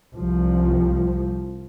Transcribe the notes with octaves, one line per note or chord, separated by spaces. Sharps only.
C2 F3